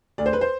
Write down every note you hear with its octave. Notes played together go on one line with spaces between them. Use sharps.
D2 D5
C5
B4
C5